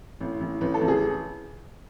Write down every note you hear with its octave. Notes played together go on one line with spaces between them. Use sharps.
A1
A1
A1 B4
A4
A1
G#4